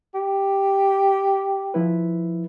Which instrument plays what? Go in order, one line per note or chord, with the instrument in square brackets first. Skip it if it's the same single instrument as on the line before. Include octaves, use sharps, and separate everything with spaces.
[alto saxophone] G4
[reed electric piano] F3 E4 B4